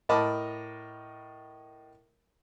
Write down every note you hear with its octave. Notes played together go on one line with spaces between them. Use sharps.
A2 A#4 D#5 A5 B5 D6